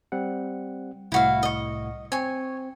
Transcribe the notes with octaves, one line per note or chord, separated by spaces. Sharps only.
G3 C4 F#5
C2 A2 E4 F#4 F5
D#5 C#6
C4 C#5 G#5